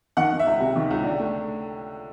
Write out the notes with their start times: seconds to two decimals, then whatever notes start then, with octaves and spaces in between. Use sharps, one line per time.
0.17 D#3 F#5
0.32 D#3
0.39 E5
0.46 C#2
0.60 C3
0.76 D#3
0.91 C#2
1.04 D3
1.19 A3